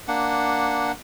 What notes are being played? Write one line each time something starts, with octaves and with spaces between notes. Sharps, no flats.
A#3 D4 F#5